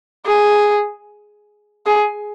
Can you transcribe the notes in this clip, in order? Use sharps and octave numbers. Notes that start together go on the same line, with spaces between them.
G#4
G#4